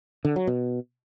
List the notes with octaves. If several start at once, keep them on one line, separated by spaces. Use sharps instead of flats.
D3
F#3
B2